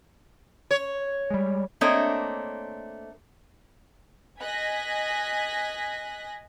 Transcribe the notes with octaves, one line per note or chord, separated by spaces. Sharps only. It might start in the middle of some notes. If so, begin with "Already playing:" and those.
C#5
G3 G#3
A3 A#3 C4 D4 C#5 D#5
D#5 G#5 F#6 G#6 A#6 B6